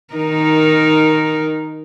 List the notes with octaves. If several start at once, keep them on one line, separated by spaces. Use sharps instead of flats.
D#3 D#4 A#4